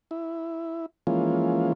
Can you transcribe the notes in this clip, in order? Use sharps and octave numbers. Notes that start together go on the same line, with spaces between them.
E4
E3 F3 G#3 A#3 C#4 F4